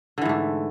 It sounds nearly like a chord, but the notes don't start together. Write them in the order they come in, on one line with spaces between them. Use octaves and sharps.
D3 E3 G#2 A3